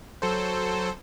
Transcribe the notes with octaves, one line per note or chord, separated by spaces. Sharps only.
F#3 A4 C5